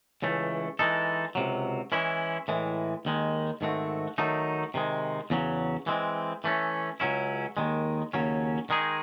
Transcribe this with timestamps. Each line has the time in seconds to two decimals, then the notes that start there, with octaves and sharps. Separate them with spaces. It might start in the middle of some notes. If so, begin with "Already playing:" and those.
0.22 C#2 C#3 E3 A3
0.79 E3 G#3 D#4 A4
1.35 C#2 C3 F#3
1.92 E3 G#3 C#4 E4
2.48 A2 E3 G#3
3.05 D#2 D#3 G#3
3.61 G#2 D#3 A3 C4 F#4
4.18 D#3 F#3 A3 D#4
4.74 C3 D#3 G#3
5.30 E2 C#3 F#3
5.87 E3 G#3 C4
6.44 E3 A3 C#4
7.00 C#2 C#3 F#3 C#4 E4
7.57 D#2 D#3 G#3
8.13 D#2 C#3 F#3 C#4
8.70 D#3 G#3 D#4 G#4